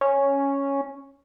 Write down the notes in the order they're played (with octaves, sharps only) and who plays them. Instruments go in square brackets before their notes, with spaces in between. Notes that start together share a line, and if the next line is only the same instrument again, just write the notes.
[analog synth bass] C#4